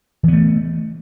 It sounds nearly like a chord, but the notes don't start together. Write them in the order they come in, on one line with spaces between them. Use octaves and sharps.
E3 B3 A3